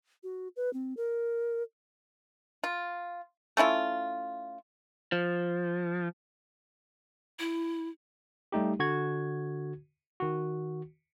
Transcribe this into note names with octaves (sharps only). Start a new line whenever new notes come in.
F#4
B4
C4
A#4
F4
A3 C#4 E4 F4
F3
E4
G3 A3 D#4 G4
D3 F#4 G#6
D#3 F#4